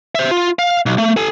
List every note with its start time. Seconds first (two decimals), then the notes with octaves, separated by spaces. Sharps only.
0.15 C5 E5
0.31 F4
0.59 F5
0.86 B1
0.98 A3
1.17 A4 G#5